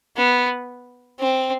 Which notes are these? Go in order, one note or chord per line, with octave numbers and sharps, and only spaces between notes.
B3
C4